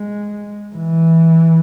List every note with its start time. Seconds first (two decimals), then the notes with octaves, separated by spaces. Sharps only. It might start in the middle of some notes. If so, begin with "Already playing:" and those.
Already playing: G#3
0.76 E3